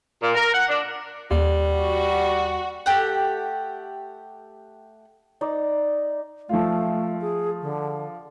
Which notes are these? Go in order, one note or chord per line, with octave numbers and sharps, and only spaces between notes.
A#2
A#4
F#5
D4
D#2 G3
F#4
A3 G4 F#5
D#4 D5
F3 A3 F4
G#4
D3